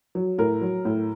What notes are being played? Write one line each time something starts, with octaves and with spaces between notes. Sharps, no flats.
F#3
A2 A#4
F#3
A2